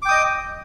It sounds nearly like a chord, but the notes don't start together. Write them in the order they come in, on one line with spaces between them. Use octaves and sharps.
D6 G5 D#6 D#5